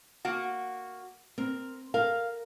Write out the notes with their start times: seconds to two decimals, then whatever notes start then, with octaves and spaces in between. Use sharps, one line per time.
0.25 A#3 F#4
1.38 C4 A#4
1.94 A#4 F5